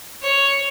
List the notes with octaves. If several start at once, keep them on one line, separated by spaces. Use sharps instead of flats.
C#5